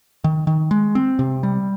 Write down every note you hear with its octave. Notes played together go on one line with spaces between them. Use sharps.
D#3
D#3
G#3
C4
C3
G3